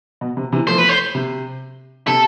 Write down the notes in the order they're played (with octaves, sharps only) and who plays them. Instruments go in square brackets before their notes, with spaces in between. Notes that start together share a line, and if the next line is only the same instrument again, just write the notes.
[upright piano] B2
C3
C3 E3
[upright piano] F3 A3 [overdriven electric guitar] C5
[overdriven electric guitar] B4
C5
[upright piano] C3
[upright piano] C3 [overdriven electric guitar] A4